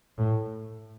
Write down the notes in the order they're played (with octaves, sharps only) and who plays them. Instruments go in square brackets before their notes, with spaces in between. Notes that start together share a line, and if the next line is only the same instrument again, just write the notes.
[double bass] A2